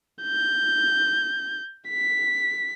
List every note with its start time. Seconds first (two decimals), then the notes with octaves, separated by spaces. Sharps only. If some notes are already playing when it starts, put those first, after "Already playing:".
0.23 G6
1.90 B6